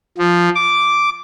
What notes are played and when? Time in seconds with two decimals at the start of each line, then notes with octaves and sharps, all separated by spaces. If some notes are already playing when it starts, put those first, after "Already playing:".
0.18 F3
0.55 D6